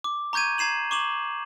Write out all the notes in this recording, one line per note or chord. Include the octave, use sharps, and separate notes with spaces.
D6
A#5 C#6 G6 G#6 D#7
A#5 G#6 C7 E7 F#7
C#6 D6 E7 F#7